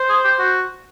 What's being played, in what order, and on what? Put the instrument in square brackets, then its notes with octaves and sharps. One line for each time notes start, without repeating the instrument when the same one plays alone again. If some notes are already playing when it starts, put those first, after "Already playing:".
Already playing: [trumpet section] C5
[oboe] G#4
G4
F#4